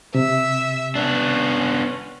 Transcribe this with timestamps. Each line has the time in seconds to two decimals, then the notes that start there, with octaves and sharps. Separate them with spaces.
0.15 C3 E5
0.96 B3 C#4 D4